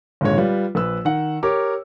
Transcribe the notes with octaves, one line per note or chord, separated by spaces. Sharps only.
G#1 A#2 D3 G#3 C#5
G3 F4 B4
A#1 B4 E6
D#3 F#5
G4 A#4 C#5 D6